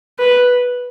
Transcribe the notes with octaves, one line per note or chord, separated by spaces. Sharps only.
B4